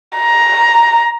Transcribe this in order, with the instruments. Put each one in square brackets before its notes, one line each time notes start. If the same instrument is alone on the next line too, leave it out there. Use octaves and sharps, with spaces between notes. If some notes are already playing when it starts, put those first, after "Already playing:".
[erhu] A#5